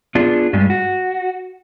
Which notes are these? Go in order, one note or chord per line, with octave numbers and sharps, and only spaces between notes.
B3 D4 F4 G#4
G2 G3 G#3
F#4